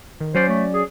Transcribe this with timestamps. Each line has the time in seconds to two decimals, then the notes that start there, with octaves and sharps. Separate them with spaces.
0.20 D#3
0.35 F#3 C#4 C5 D5
0.49 A3
0.74 G#4